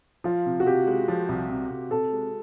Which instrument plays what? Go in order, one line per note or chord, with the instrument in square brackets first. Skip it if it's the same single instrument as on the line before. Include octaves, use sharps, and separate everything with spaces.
[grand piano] F3 [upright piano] F4
[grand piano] C3
[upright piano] F#4
[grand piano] C3 [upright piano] G4
[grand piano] G#3
F3
C2
C3
C3
[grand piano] C3 [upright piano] A4
[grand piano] G#3